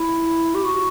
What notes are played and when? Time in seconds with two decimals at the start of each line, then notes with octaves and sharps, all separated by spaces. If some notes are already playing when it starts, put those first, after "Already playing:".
Already playing: E4
0.54 G4
0.63 F#4